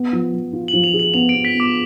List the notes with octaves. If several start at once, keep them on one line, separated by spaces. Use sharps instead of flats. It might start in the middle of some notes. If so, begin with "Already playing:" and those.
Already playing: B3
F3
F3
F4
F#7
F3
F7
G#4
F#7
B3 F7
D7
B3
B6
B3
D6